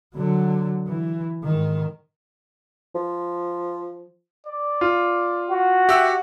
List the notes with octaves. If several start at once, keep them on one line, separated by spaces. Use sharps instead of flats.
D3 F#3
E3
G#2 D#3
F3
D5
F4
F#4
G4 E5 F#5 E6 F#6